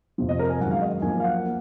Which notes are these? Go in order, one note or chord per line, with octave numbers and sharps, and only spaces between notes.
F2 C3 F3
D#5
A#4
G#5
F#2 D#3 G#3 F#5
F5
D#5
F#2 F3 A#3 G#5
F5
F#5
A#3